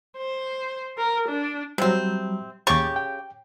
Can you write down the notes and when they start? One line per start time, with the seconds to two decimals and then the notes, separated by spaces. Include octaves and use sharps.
0.17 C5
0.98 A#4
1.28 D4
1.78 C3 F#3 G3 C4
2.67 D#2 C#3 G4 C#6 D6 A6
2.96 G5